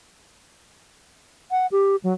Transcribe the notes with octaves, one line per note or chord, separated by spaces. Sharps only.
F#5
G4
F#3